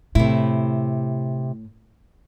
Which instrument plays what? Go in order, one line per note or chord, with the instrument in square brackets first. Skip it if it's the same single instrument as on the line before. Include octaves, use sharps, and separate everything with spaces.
[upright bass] A2 [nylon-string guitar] C3 E4